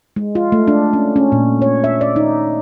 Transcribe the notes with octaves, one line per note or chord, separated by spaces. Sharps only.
G#3
F4
A3
D4
C#4
C#4
A#2
C#5
E5
D5
D#4